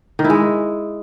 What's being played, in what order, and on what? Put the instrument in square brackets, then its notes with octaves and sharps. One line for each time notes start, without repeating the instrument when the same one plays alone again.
[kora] D#3
E4
G#3